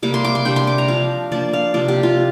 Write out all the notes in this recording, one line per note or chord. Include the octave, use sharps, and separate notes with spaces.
C3 G3 A#3 D6
C6
D6
C6
C3 G3 D4 G5
C6
D6
A#5
F3 D4 F5
F3 A#3 D4 D5
F5
C3 F3 A#3 D4 D5
G4
F4